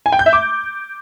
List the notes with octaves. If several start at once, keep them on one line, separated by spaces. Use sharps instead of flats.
G#5
G5
G6
E5
D6